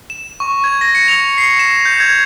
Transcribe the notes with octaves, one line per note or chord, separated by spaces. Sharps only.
E7
C#6
G#6
A#6
C#7
F7
C7
E7
G6
G#6